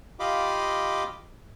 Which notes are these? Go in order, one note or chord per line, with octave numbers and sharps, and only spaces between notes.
F4 G4 D#5 F5 B5 D6